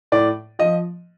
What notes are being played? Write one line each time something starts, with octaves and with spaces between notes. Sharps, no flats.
A2 D5
F3 D#5